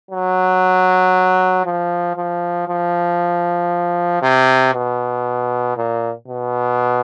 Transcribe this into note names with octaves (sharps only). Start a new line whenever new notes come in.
F#3
F3
F3
F3
C3
B2
A#2
B2